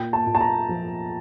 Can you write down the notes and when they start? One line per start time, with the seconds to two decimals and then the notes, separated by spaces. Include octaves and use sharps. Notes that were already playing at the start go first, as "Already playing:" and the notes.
Already playing: A#2 G5
0.13 A5
0.27 A#2
0.35 A5
0.41 A#5
0.69 F3